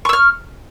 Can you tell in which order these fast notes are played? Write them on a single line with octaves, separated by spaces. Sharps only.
C#6 E6 F6